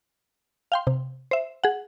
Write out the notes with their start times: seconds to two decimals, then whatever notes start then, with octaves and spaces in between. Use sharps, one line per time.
0.72 F5 G5 C6
0.87 C3
1.31 C5 E5
1.64 G#4 F#5